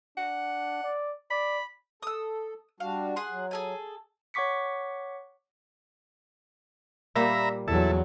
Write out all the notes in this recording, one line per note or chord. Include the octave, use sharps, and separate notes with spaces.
D4 F#5
D5
D5 B5
A4 D#6 E6
G3 D4 F#4 F5
G#4 F#5 C6
F#3
G#4 A4 G#5
C#5 F#5 C#6 D6 B6 C#7
A#2 G3 A#3 E5 A#5 B5
E2 F#3 E4 A4